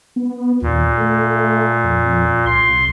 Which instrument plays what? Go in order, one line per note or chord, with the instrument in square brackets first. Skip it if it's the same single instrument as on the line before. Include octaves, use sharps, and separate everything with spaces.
[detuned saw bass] B3
[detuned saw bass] D#2 [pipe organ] A#2
[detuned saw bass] A3
F2
[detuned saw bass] C2 [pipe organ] C6